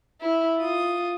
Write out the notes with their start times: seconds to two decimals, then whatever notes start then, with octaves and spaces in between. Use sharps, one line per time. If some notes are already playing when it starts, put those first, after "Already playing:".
0.21 E4
0.58 F4 D#6